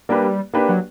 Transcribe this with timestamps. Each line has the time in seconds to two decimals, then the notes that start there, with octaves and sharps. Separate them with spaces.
0.09 G3 A#3 D4 G4 B4
0.54 A#3 D4 G4 B4
0.69 F#3